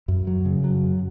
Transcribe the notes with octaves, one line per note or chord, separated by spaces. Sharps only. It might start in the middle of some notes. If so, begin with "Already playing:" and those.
F#2
F#3
C#3
F#3
F#2